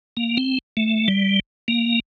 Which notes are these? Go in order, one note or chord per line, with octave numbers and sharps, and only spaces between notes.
A#3
C4
A3
G3
A#3